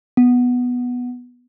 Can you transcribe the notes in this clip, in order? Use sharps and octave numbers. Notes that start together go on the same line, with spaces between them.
B3